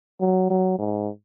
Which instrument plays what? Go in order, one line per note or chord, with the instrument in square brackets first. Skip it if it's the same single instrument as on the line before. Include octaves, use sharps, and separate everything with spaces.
[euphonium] F#3
F#3
G#2